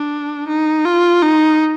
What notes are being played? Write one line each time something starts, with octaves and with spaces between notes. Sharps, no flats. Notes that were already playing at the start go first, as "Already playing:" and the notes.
Already playing: D4
D#4
F4
D#4